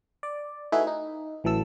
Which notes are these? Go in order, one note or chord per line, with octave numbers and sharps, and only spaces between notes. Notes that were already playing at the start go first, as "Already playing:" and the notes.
D5
A3 D#4 E4 F#4 G#4 B4
D#4
A1 E3 F#3 A4 E6